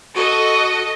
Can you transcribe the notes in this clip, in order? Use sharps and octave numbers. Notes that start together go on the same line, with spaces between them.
F#4 A4 D#5